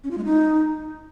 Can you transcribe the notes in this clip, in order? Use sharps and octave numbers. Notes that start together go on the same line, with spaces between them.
C#4
F4
G#3
D#4